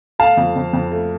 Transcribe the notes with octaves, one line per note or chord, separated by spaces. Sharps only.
A3 F5 A5
F2
F2
F2
A3